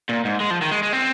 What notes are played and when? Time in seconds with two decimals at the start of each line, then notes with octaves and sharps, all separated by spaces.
0.09 A#2
0.25 G#2
0.40 G#3
0.50 F3
0.62 D#3
0.72 G#3
0.83 G#3
0.93 C4